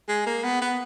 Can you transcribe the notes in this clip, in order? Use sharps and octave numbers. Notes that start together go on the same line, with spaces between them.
G#3
A#3
B3
B3